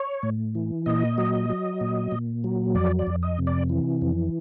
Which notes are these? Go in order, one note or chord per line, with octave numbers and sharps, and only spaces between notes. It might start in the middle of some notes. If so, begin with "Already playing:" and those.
Already playing: C#5
A2
E3
A#2 D#5
F#3
F#3
A#2
A#2
F#3
F2 D5
D5
F2
D#5
C3
D5
E3
F2